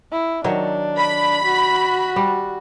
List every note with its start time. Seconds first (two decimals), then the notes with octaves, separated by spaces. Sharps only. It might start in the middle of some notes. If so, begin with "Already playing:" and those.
0.12 E4
0.44 D#3 F#3 D4 C#5
0.98 B5
1.44 F#4
2.16 G3